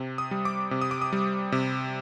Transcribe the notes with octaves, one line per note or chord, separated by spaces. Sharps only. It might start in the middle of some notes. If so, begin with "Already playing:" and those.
Already playing: C3
D#6
G3
D6
C3
D#6
D6
D#6
G3
C3